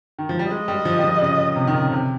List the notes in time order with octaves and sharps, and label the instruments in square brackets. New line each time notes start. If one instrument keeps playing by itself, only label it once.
[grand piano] D#3
F3
G3
[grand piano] G#3 [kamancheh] D#5
[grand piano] G3
F3
G3
F3
C#3
C3
D#3
C#3
C3